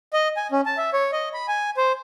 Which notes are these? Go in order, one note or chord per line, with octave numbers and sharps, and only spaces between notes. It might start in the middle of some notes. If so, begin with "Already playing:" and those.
D#5
G#5
C#4
A5
E5
C#5
D#5
B5
G#5
C5